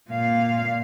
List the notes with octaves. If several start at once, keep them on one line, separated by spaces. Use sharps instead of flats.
A#2 F5